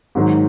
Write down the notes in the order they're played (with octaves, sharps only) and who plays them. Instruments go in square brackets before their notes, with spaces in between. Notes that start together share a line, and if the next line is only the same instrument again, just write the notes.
[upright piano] G#2 D#3 F#3